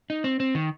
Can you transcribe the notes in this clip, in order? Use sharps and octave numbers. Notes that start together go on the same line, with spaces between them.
D#4
C4
C4
D#3